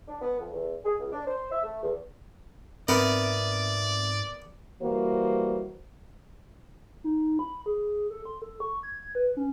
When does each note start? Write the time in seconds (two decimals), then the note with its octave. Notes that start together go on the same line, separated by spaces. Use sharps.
0.08 D4
0.21 B3
0.39 F2
0.53 E2
0.84 G#4
0.98 C#2
1.12 D4
1.26 C5
1.51 E5
1.63 A3
1.82 E2
2.88 G#2 B3 C4 A#4 D5 E5
4.82 E3 G3 A#3 F#4 C5
7.04 D#4
7.39 B5
7.66 G#4
8.10 A4
8.25 C6
8.42 A4
8.60 C#6
8.83 G#6
9.15 B4
9.37 C#4